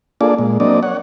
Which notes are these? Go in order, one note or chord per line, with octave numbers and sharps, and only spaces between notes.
A#3 D4 F4 G#4 A4 D5
A#2 G#3
F#3 A#3 C4 D4 D5 D#5
C#5 F#5